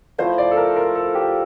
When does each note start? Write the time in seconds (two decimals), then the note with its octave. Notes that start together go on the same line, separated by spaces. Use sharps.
0.18 F3 A3 E4 C5
0.38 D5
0.51 A4
0.57 A#4
0.76 A#4
0.95 A4
1.15 G4